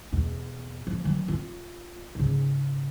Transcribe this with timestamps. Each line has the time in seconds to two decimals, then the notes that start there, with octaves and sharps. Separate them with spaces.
0.12 E2 B2
0.87 F3
1.04 D#3 F#3
1.28 F4
2.15 G#2 C#3